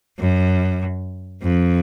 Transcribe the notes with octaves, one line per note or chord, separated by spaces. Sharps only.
F#2
F2